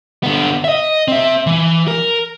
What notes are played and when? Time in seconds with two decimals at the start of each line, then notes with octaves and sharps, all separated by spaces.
0.23 D3 B3
0.64 D#5 E5
1.08 C4 E5
1.47 E3
1.88 A#4